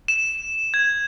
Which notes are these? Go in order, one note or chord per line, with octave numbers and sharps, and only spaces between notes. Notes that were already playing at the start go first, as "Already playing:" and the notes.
E7
G#6